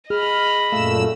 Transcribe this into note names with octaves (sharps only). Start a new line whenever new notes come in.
G#4 D#5 B5 F6
F#2 A#2 A3 F5 E6